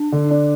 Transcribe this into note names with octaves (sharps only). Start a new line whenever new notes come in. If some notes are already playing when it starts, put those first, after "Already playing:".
Already playing: D4
D3
D4